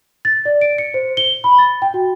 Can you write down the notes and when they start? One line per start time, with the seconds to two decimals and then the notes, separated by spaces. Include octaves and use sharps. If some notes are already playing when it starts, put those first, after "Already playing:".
0.25 A6
0.45 D5
0.61 D7
0.78 C#7
0.94 C5
1.17 G7
1.44 B5
1.59 A6
1.82 G5
1.94 F#4